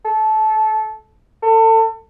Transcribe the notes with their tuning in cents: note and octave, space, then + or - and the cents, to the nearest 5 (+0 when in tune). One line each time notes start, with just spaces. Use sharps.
A4 -20
A4 +30